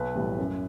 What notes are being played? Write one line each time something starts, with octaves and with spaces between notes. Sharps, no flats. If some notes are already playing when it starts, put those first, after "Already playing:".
Already playing: B1 B4
A2 E3 G3 B3
F#2